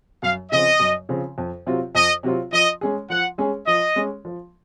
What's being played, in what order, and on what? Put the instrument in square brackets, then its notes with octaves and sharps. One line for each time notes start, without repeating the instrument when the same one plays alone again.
[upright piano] F#2 [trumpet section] F5
[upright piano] C#3 F3 C4 [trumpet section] D#5
[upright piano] F#2
C#3 F3 C4
F2
C3 F#3 C4 F4
[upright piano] F2 [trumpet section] D#5
[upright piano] C3 F#3 C4 F4
[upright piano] F3 [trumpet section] D#5
[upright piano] G#3 C#4 G#4
[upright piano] F3 [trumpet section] F#5
[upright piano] G#3 C#4 G#4
[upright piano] F3 [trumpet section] D#5
[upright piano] G#3 C#4
F3